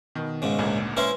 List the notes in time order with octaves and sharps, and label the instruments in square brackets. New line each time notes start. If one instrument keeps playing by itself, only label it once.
[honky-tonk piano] B2 D#3
[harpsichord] C#2 G#2 C#3
[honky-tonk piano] G#1 D2 A#2
[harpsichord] C#4 E4 C5 [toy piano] B4 E5 C6